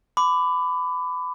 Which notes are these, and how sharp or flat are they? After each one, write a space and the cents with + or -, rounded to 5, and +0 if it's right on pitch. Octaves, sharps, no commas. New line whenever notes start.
B5 +25 D6 +0